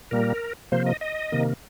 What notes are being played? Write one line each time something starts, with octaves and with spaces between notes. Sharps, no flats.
A#2 G3 A#3 A#4
C3 F3 A#3 C5
D#5
D#5
C3 D#3 A#3